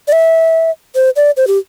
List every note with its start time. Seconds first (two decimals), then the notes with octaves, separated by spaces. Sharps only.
0.08 D5
0.12 E5
0.95 C5
1.16 D5
1.37 C5
1.47 G4